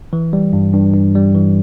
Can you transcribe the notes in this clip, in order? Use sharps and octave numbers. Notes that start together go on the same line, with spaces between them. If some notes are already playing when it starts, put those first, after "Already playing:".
E3
G3
G2
G2
G2
G3
E3